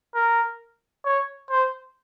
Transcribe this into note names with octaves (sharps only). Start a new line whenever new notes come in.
A#4
C#5
C5